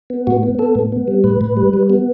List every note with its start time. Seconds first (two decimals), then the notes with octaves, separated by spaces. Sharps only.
0.10 B3
0.27 A2 F#4
0.43 B3
0.59 B3 A4
0.75 A2
0.92 B3
1.08 G3
1.24 A2 B4
1.41 A2
1.57 G3
1.73 G3
1.90 B3